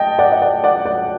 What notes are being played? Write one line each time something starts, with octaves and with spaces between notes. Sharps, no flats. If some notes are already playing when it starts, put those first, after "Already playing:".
Already playing: D#5 G5 A5
D5 F#5
D#5
D5 F#5
D5 F#5
D5 F#5